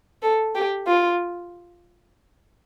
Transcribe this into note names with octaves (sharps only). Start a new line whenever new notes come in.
A4
G4
F4